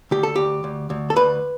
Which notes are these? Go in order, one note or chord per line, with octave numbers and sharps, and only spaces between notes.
D2 G4
A4
D2 G4
D2
D2
A4
D2 B4